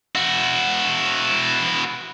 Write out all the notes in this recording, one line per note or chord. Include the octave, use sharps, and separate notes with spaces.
E4 F#4